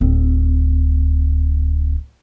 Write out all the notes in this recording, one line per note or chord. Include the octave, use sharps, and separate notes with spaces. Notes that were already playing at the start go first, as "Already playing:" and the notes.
D1 C4